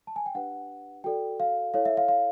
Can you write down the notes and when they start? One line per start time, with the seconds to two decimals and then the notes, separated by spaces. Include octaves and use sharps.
0.07 A5
0.16 G#5
0.26 G5
0.35 D4 G4 B4 F#5
1.04 F#4 A4 D5 G5
1.40 F5
1.74 E4 A4 C#5 F5
1.85 E5
1.97 F5
2.08 F5